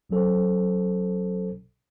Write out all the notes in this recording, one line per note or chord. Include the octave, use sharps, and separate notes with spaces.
B1 F#3 C#4 A4 C5